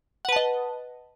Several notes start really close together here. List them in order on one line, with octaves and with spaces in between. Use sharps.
F#5 B4 A5 D#5